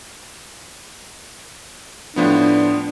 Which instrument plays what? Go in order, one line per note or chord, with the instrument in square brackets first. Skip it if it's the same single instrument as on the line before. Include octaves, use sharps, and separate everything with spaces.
[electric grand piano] A2 F3 B3 [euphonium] D4